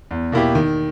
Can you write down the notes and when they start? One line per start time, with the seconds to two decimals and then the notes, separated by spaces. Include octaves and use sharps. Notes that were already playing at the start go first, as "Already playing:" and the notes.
0.11 E2
0.32 B2 A#3 E4 G4
0.55 D#3